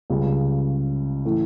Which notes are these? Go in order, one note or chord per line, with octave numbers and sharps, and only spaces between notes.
C#2 C#3 G3
A2 E3